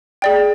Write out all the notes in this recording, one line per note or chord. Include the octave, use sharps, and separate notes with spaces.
G#4 D5 G5